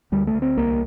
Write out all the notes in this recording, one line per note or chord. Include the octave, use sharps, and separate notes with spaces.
D2 G3
A3
D2
C4
C2 A#3